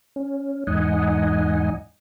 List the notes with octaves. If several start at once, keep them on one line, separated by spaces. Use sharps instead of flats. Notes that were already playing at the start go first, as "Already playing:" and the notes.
C#4
E2 G#2 D#4 D#5 F#5 G#5